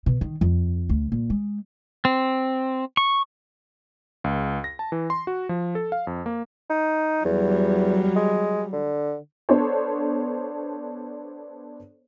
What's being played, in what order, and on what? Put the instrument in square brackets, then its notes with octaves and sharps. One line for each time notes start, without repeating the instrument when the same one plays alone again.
[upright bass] B2
D#3
F2
D2
A#2
G#3
[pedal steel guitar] C4
C#6
[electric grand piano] C#2
A#6
A5
E3
C6
F#4
F3
A4
F5
F2
A#3
[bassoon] D#4
[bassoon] E2 [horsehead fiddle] F#3 G3
[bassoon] G#3
D3
[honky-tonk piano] B3 D4 A4 C5 C#5